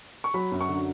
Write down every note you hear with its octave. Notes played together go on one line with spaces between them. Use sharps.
C#6
F#3 B5
F#2
C#6
D3